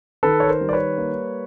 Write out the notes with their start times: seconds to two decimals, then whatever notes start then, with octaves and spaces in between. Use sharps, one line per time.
0.23 D#3 A4 B4
0.40 C#5
0.48 A#4 C5
0.61 G3
0.69 D5
0.73 B4 C#5
0.98 A#3